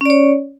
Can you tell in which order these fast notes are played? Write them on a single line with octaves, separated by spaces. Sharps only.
C#4 D5 C#5